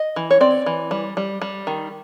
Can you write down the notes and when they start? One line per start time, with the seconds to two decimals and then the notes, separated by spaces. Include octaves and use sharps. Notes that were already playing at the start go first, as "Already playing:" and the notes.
Already playing: D#5
0.16 E3
0.31 C#5
0.41 C4 D5
0.66 E3
0.91 G3
1.17 G3
1.42 G3
1.67 D#3